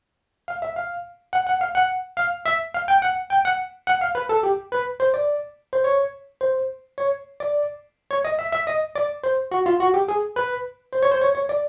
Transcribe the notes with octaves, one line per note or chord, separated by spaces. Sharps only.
F5
E5
F5
F#5
F#5
F5
F#5
F5
E5
F5
G5
F#5
G5
F#5
F#5
F5
B4
A4
G4
B4
C5
D5
C5
C#5
C5
C#5
D5
C#5
D#5
E5
E5
D#5
D5
C5
F#4
F4
F#4
G4
G#4
B4
C5
C#5
C5
C#5
C#5
D5